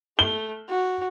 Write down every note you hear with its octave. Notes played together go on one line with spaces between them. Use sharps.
A3 G7
F#4